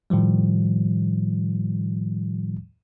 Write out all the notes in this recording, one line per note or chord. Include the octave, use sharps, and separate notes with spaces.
A2 D#3 F3 G3